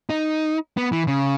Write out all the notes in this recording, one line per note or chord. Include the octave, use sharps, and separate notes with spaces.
D#4
B3
E3
C#3